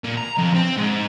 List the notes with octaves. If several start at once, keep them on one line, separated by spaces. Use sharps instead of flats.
A#2
A#5
F2
C4
G#2